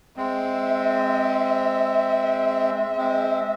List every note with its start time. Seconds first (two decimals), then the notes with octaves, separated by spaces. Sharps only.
0.17 G#3 C4 E5
2.98 G#3 C4